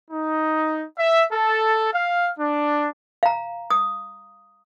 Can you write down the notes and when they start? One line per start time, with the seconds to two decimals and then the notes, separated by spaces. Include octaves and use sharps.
0.11 D#4
0.97 E5
1.30 A4
1.92 F5
2.38 D4
3.23 F5 A#5
3.70 D#6